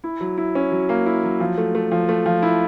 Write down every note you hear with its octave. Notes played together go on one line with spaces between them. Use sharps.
E4
F#3
E4
C#4
F#3
A#3
E4
F#3
F3
A3
A3
F3
A3
F3
E4